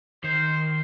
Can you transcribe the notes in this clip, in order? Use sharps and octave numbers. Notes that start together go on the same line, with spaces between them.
D#3 C5